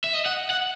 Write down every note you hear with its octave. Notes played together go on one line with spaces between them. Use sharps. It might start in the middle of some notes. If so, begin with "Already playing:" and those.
E5
D#5
F#5
F#5